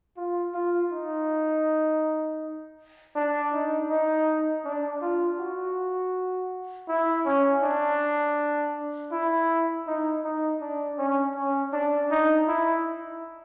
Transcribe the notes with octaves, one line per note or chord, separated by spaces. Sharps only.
F4
F4
D#4
D4
D#4
D#4
D4
F4
F#4
E4
C#4
D4
E4
D#4
D#4
D4
C#4
C#4
D4
D#4
E4